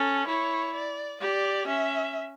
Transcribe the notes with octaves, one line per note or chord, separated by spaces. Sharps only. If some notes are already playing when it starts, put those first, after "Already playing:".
Already playing: C#4 A4
E4 C#5
D5
G4 D5
C#4 E5